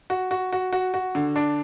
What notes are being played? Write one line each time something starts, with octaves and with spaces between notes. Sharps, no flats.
F#4
F#4
F#4
F#4
F#4
D3
D4